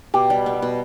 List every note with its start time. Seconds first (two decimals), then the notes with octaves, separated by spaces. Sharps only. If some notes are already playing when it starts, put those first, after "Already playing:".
0.14 B2 G4
0.30 G3
0.46 B3
0.62 B2